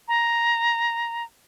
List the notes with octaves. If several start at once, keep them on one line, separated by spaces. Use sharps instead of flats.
A#5